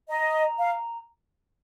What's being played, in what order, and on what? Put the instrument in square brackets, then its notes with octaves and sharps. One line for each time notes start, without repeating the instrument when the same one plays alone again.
[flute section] D#5 [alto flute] A#5
[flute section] F5